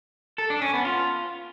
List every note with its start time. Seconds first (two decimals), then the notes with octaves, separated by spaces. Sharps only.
0.38 A4
0.50 D4
0.62 C#4
0.73 B3
0.85 F4